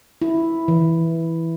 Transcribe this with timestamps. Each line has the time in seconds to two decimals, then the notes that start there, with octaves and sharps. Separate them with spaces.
0.22 E4
0.68 E3